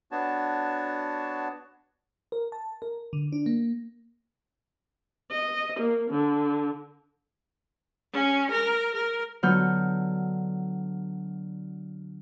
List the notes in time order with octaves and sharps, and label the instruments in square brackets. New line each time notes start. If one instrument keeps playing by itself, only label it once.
[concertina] B3 D4 F#4 C#5 A5
[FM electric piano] A#4
A5
A#4
D3
D4
A#3
[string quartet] D#5
A#3
D3
[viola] C#4
A#4
A#4
[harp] D3 F#3 B3 F6 G6